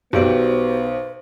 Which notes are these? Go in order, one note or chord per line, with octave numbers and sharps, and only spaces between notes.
B1 B3 F#4 G4 C5 D5